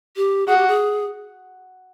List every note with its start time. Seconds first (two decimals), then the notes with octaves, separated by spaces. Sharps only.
0.16 G4
0.47 F#4 G#4
0.57 G4
0.68 G#4